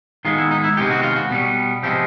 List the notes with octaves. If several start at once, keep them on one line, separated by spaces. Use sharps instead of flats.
D#3 G#3 B3 F4
E4
D#4
E4
C3 D#3 G#3 B3 G4
F#4
F4
F#4
B2 G3 B3
C3 F3 G#3 B3 G4